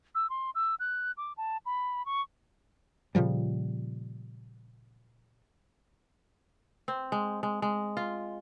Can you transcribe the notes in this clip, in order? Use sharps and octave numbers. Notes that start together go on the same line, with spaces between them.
E6
C6
E6
F#6
D6
A5
B5
C#6
A#2 C#3 F3 G3
C4
G#3
G#3
G#3
F4